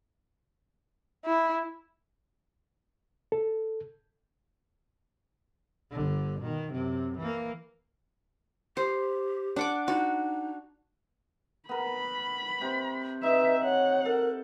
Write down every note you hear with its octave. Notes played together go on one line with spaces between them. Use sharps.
E4
A4
G1 D3
B2 D#3
F#2 C3
E3 A#3
G4 C5
D4 F#5 D6
D#4 F#4
B3 A#4 B5
C3 C5
D#4 B4 E5
C#5 F#5
A4 A#4